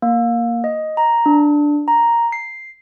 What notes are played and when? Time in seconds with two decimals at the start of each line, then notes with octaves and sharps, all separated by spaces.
0.02 A#3
0.64 D#5
0.97 A#5
1.26 D4
1.88 A#5
2.32 C7